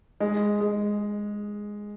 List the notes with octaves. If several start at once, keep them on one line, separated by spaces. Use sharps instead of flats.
G#3
G#3